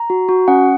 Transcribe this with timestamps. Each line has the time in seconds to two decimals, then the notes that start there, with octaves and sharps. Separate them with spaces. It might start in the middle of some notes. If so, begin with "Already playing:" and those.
Already playing: A#5
0.10 F#4
0.29 F#4
0.48 C#4 F#5